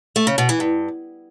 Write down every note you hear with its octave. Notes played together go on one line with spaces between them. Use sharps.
A3
C#3
B2
E3
G2